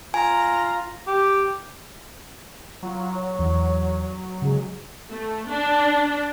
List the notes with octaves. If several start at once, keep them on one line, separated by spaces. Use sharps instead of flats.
F4 G#5 A#5
G4
F#3 F4
C#5
E2
C#3 G#3
A3
D4